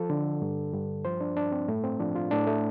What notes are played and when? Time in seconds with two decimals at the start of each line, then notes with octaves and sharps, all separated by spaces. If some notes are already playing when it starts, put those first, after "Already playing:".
Already playing: F3 A4
0.10 D3
0.42 G2
0.73 G2
1.05 F3 C5
1.21 D4
1.36 G2 D4
1.52 C4
1.68 A2 A3
1.84 C4
2.00 F3 D4
2.16 F4
2.31 A2 D4
2.47 A3